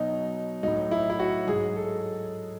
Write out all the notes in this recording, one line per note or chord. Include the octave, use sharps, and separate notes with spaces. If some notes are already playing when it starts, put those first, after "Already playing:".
Already playing: B2 F#3 D#4
A2 F#3 D#4
E4
E4
F#4
G#2 F#3 G#4
A4